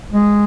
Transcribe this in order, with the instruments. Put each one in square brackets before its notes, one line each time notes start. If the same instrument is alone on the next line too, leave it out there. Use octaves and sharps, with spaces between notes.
[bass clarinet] G#3